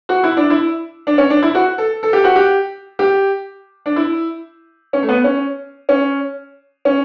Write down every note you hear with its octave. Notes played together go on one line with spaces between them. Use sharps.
F#4
E4
D4
E4
D4
C#4
D4
E4
F#4
A4
A4
G4
F#4
G4
G4
D4
E4
C#4
A3
B3
C#4
C#4
C#4